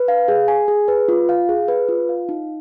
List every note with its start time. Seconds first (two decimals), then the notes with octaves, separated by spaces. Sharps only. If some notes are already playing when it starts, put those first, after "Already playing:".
Already playing: B4
0.08 F5
0.28 G#4
0.48 G#5
0.68 G#4
0.88 B4
1.08 F4
1.29 F5
1.49 G#4
1.68 B4
1.89 F4
2.09 F5
2.29 D#4